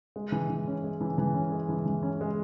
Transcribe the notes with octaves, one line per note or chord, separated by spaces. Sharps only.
G#3
E3
E3
C#4
G#3
E3
E3
C#4
G#3
E3
E3
C#4
G#3